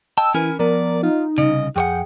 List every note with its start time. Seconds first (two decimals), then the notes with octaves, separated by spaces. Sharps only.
0.18 D#5 G5 A5 E6
0.34 E3 C#4 E4 A#4 G#5
0.59 F3 B3 A#4 D5
1.03 D#4 F4
1.38 C2 G2 C#3 D#5
1.76 F2 G#4 C#5 F#5 G5